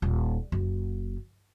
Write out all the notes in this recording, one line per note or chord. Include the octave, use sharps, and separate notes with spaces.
D#1
F#1